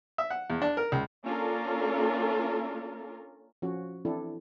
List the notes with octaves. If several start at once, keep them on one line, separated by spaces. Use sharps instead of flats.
E5
F#5
E2
D4
A#4
C#2
A#3 C#4 D4 F4 A4 A#4
F3 C#4 F#4
E3 C4 D4 E4 A4